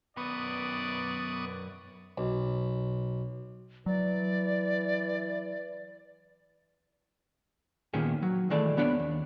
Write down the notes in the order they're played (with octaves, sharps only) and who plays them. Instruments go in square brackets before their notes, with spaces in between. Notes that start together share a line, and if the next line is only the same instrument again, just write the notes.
[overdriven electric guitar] F#2 B4 [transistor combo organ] B3 C#6 D#6 [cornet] D5
[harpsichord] B1
[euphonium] E3 [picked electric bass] F#3 [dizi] D5
[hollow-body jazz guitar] A#2 D#3 A#3 B3 C#4 G#4
F#3
D#3 E3 G#3 A3 D5
D#2 B3 D4 C#5 D5 B5
D#2